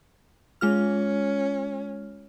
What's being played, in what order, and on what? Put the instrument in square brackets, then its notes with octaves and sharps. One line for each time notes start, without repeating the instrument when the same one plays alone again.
[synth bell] G#3 F4 F6 [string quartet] C#4